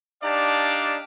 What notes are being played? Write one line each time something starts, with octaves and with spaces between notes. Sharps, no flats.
D4 D#4 G4 D5 F5 A5